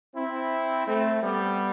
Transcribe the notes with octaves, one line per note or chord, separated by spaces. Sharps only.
C4 E4
A3 C4
G3 B3